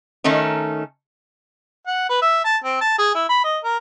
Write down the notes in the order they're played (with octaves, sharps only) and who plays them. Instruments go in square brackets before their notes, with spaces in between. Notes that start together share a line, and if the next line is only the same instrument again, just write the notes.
[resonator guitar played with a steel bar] D#3 A3 C#4 D#4
[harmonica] F#5
B4
E5
A5
C4
A5
G#4
E4
B5
D#5
A#4